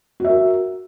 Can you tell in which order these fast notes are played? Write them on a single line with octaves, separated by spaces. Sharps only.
F#4 E5 A#4